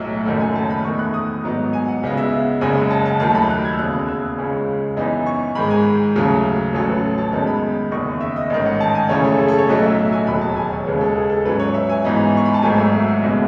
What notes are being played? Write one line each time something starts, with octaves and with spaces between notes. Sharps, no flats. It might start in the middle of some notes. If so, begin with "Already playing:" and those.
Already playing: B1 A2 F#3 D#5 E5
F#1 F#2 D#3 A3 F#5
G#5
A5
B5
E2 D#3 A3 D#4 C#6
F#6
D#6
G#2 F#3 B3 D#4
G#5
F#5
C#2 C#3 G#3 B3 D#5
E5
F#1 F#2 C#3 G#3 G#5
F#5
A5
A5
D#2 D#3 F#3 A3 A5
B5
F#6
G#6
E6
F#1 E2 C#3 F#6
E6
C#2 C#3 G#3 C#4
F#2 E3 B3 D#4
C#6
G#2 D#3 G#3 B5
G#5
D#2 C#3 F#3 A3
A1 A2 F#3 C#4 A4
B4
A5
F#2 D#3 G#3 B3 A5
B5
F#1 E2 D#3 C#6
E5
D#5
A1 G#2 D#3 D#5
F#5
A5
G#5
F#2 C#3 E3 A3 C#4 C#5
A4
G#4
A4
C#5
B1 A2 F#3 A3 D#4 D#5
E5
E5
G#5
E1 D#2 D#3 F#3 B5
A5
G#5
C#5
D#2 C#3 G#3 B4
A4
G#4
A4
G#2 F#3 C#4 B4
C#5
E5
G#5
G#2 E3 B3 D#4
C#6
B5
A5
G#1 G#2 D#3 F#3 A3 G#5
E5
E5
F#5
F#1 B2 G#3 B3 E5